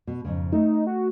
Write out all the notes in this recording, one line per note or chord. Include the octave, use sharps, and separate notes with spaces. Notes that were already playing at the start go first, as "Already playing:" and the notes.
B2
F2 G#2 C#3
A3 D#4
F#4